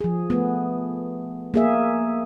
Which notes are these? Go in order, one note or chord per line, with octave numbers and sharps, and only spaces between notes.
F3 G#4
A3 B3
A#3 G#4 E5